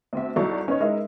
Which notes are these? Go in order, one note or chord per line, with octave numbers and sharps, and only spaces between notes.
D2 C4 E5
C2 F#3 D#4 A4 D5 C#6
C#4 D#4 B4 C#5
G#3 D#4 E4 A#4